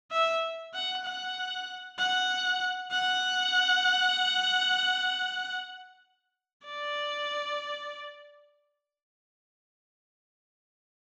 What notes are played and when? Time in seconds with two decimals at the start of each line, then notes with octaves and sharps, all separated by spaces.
0.12 E5
0.74 F#5
1.05 F#5
1.98 F#5
2.92 F#5
6.65 D5